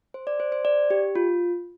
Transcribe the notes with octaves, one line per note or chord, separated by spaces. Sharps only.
C5
D5
C5
C5
D5
G4
F4